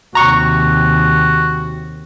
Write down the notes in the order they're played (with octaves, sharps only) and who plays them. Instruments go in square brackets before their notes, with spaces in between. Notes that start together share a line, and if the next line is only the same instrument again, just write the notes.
[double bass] D#2 C3 [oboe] F#4 [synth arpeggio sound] A#5 C#6